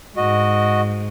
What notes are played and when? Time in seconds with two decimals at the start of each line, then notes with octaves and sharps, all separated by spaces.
0.17 G#2 F#4 D#5